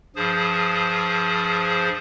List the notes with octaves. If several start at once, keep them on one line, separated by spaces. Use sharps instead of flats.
G2 F3 G#4 C5